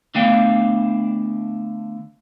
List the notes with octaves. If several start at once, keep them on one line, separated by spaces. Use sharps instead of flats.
D3 A3 B3 D4 F5 G5